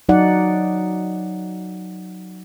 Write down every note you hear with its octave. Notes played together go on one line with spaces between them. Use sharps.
F#3 D#4 D5 F#5